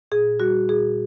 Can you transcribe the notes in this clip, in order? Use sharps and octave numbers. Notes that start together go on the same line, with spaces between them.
A#2 G#4
G3 F#4
A#2 G#4